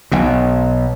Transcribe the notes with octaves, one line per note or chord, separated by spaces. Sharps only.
B1 B2